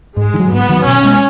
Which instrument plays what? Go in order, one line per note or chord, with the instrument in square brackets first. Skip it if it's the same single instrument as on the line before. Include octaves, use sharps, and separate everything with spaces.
[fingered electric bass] G#2 [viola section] G#3
[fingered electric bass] D#3
F#3
[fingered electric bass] G#2 [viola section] B3
[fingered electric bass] D#3 F#3
[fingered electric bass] B2 [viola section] C#4
[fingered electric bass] G#3 B3